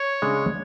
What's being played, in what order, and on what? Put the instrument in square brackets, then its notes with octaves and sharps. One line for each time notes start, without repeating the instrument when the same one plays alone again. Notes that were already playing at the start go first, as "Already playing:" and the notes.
Already playing: [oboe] C#5
[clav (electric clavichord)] C#3 G#3 D4